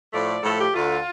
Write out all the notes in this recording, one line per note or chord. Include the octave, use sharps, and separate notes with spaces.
A2 F3 A3 D5
A2 F3 A3 A4
G4
D2 D3 A3 F4